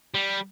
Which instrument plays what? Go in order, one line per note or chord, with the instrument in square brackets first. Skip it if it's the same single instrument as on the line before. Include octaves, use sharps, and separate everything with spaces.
[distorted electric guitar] G3